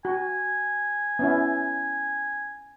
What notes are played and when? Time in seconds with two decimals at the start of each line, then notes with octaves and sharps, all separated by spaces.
0.05 F#4 G#5
1.19 B3 C#4 E4